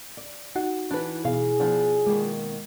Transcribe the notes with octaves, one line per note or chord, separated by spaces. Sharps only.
D5
D#4 F#4 F#5
E3 D4 B4
B2 G#4 F5
F3 B3 D4
B2 D#3 G#3 A#3